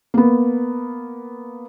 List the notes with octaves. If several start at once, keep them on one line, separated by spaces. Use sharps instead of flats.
A#3 B3